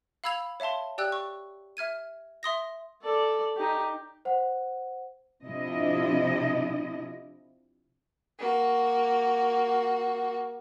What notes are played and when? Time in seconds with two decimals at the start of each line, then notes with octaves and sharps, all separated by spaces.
0.24 F5 B5 E6 G#6 F7
0.60 C#5 E5 F5 A5 C6
0.98 G4 D5 G5 E6 F#6
1.12 C#6
1.77 E5 F6 G#6 D#7
2.43 E5 C6 D#6 A#6
3.03 A4 D5
3.56 D#4 G4
4.25 C5 F#5
5.44 C3 F3 D4 E4 D#5
8.38 A#3 F#4